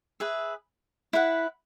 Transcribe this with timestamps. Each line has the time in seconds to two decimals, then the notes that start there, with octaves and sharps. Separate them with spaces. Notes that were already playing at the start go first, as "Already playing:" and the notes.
0.20 G#4 B4 E5
1.13 E4 B4 F#5